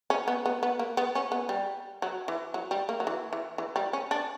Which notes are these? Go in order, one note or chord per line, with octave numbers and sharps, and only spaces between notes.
C#4
B3
B3
B3
A#3
B3
C#4
B3
G3
F#3
E3
F#3
G3
A#3
F#3
E3
E3
E3
G3
C#4
D4